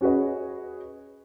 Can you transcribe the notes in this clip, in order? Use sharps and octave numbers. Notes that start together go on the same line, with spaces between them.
C#4 F#4 G#4 B4 D#5